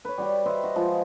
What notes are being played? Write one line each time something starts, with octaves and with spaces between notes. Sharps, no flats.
B4 C#5
G3 F#4 G5
B4 C5 D#5 E5
F#4
F3 G#3